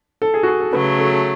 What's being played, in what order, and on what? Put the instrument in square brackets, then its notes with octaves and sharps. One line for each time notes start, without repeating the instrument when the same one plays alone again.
[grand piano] A4
G#4
F#4
G#4
A4
[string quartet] C#3 F#3 A3 [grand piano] B4
[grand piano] A4
A4